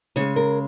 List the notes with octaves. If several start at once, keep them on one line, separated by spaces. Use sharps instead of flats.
C#3 G#3 C#5
A#4